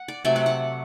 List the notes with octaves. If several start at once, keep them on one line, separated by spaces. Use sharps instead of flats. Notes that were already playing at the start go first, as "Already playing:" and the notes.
Already playing: F#5
D5
C3 F#3 A3 D5
F#5
F#5